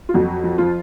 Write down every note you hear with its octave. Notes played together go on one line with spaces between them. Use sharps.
F4
F2 F#3 F#4
F3
F3 F4